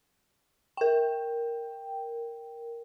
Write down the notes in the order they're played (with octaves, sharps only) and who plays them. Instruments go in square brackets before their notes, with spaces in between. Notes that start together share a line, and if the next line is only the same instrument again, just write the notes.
[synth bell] A#4 G5